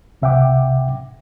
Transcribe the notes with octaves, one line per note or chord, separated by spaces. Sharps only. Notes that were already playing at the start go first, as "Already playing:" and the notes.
C2 C3 E5 F#5 G5 D6